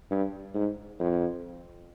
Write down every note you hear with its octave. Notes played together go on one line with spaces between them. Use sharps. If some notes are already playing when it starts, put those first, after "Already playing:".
G2
G#2
F2